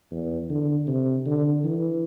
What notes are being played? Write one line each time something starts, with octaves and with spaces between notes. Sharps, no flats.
E2
D3
C3
D3
E3